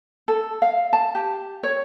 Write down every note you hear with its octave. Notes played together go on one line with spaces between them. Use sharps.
A4
F5
A5
G4
C#5